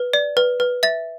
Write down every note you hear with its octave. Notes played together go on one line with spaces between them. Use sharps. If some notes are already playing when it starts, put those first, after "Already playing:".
Already playing: B4
D5
B4
B4
E5 A6